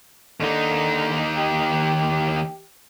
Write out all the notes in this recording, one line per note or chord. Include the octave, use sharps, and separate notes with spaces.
D#2 D3 D#4
G4